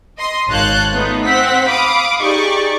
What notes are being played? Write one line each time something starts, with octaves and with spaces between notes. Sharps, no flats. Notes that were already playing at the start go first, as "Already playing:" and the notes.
D#5 C6
G#1 C#5 F5 A5 F#6 G6
A3 B3 D#4 F4
C4 C5 F#5 B6
F5 B5 D6 D#6
D#4 G4 G#4 D5 C#6